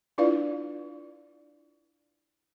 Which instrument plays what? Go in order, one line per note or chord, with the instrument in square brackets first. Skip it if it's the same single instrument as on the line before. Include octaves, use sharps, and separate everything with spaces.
[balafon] D4 E4 F4 B4 D5 F5